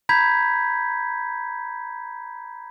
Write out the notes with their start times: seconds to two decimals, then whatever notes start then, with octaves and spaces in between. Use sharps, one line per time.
0.09 A#5 B5 G6 G#6 B6